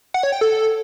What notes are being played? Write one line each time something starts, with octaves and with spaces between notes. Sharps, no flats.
F#5
C#5
G5
A4